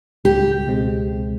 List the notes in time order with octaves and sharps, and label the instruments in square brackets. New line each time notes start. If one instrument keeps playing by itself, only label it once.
[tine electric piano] C#2 [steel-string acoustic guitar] G4
[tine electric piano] B2 G#3 C4